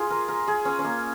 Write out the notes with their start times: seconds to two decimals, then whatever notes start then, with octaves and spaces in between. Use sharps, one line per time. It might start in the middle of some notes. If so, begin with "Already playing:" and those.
Already playing: F4 G#4
0.10 A#4
0.28 A#4
0.48 G#4
0.65 C#4
0.79 C#4
0.85 A#3